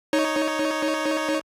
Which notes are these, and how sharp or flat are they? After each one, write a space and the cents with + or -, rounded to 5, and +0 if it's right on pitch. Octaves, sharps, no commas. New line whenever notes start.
D#4 +0 C#5 +0